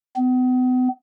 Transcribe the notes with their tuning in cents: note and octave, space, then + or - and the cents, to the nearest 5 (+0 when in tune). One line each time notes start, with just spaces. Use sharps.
B3 +40